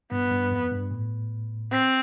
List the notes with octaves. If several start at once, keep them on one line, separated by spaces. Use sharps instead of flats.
G2 B3
G2
F2
G2
A2
C4